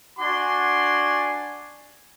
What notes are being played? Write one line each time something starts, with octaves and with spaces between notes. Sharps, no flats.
D4 F#4 D5 G#5 C6 D6